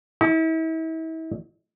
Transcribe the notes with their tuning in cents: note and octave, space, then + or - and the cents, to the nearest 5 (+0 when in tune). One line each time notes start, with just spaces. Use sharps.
E4 -40